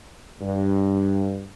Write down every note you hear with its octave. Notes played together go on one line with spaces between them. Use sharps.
G2